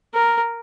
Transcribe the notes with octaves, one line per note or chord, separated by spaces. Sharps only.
A#4